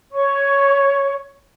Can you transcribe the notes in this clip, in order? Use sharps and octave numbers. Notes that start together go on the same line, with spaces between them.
C#5 C#6